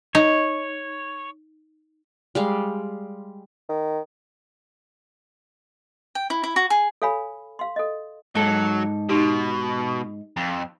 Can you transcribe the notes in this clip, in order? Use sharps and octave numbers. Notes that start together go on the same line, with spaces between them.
D#4 C#5
G3 G#3 F5
D#3
G5
E4
E4
F#4
G#4
A4 C#5 F5 G#5 B5
F5 C6
A4 D#5
G#2 F#3 A4
B2 D#4 G4
F2